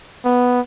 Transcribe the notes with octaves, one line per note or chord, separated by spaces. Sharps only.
B3